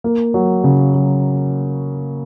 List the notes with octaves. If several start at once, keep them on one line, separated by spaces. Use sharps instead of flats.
A#3
F#3
C#3
F#3